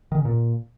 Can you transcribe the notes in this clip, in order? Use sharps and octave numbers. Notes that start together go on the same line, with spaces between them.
D#3
C#3
A#2